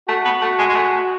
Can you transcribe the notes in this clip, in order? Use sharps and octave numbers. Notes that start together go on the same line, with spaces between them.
A3 F#4
B3
A3
G#3
G#3
A3